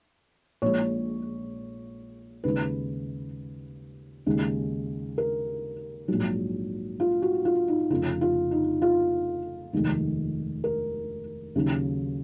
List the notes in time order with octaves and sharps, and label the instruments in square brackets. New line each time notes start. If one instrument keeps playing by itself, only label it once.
[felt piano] A#1 A#2 G#3 C#5
D#2 C#3 G#3 B4
D#2 C#3 G#3
A#4
A#1 G#2 F#3
F4
F#4
F4
D#4
F1 F2 C#3 F4
F4
D#4
F4
F1 D#2 D#3 G#3
A#4
D#2 C#3 F#3